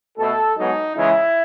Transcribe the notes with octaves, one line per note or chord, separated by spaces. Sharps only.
B2 A3 A4
G#2 F#3 B3 D#4
C#3 E3 G#3 E4